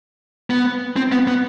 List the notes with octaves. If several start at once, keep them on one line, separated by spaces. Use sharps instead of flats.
B3
C4
B3
B3